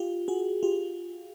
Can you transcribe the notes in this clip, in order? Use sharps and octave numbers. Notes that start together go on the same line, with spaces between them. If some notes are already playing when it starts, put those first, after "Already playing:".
Already playing: F4 G4
F#4 G#4
F4 G4